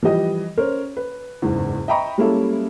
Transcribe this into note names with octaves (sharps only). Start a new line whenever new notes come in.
E3 F3 G3 G4 D#5
C#4 A#4 C5 C#5
B4
F#1 E2 G#2
D#5 E5 G5 A#5 B5 C#6
G3 G#3 A#3 C#4 E4 A4